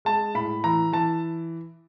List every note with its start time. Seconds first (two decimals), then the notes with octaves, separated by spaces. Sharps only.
0.05 G#3 A5
0.34 A2 B5
0.64 E3 A#5
0.93 E3 A5